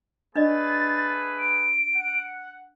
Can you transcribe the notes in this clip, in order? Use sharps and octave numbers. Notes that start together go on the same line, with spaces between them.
A3 D4 G#4 B4 D5 D#5 A6
D7
F#5